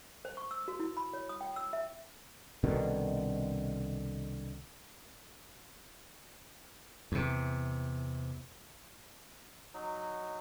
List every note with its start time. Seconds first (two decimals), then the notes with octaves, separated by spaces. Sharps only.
0.25 C5
0.37 C#6
0.51 E6
0.68 F#4
0.80 E4
0.97 B5
1.13 C#5
1.29 D#6
1.41 G5
1.56 E6
1.73 E5
2.64 C2 B2 D3 D#3
7.12 E2 C3
9.74 F#3 D#4